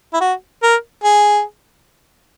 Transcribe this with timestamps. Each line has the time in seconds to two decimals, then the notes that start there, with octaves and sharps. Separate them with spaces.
0.14 E4
0.21 F#4
0.63 A#4
1.04 G#4